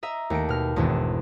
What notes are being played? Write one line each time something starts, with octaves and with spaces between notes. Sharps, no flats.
D#5 E5 A#5
D#2 A3 A#6 C#7 D7
B2 F6
G#1 E2 B2 D4 E5 E7